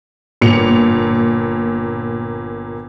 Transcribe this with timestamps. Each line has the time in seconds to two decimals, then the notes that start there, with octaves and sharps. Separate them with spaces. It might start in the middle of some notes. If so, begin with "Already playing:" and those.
0.41 G1 A#2 C#7 F7